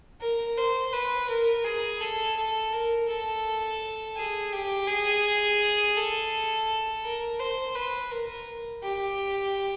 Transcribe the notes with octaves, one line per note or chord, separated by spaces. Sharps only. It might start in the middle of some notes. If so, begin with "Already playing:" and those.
A#4
C5
B4
A#4
G#4
A4
A4
A#4
A4
G#4
G4
G#4
A4
A#4
C5
B4
A#4
G4